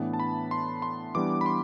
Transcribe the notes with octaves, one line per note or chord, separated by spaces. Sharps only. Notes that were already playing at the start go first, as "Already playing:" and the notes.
Already playing: A2 E3 B3 D4
A5
B5
C6
C6
E3 G3 B3 D4 D6
B5
C6